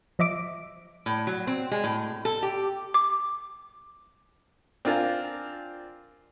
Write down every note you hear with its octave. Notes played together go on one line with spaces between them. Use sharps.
F3 D#5 E5 D6 D7
A2
F#3
C4
G#3
A2
A4
G4
D6
C4 D4 F4 A#4 F5 G#5